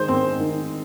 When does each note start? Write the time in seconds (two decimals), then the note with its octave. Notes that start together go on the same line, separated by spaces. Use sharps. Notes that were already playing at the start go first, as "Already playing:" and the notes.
Already playing: D#3 G#3 C5
0.08 C4
0.40 D#3